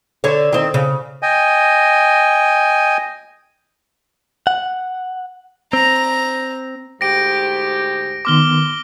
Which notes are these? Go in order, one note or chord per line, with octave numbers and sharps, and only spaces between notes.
D3 C#5
D#3 C4
C#3
D#5 G5 G#5
F#5
C4 A#5
D2 G#2 G4 A#6 D7
D#3 B3 C6 D6 F6 G7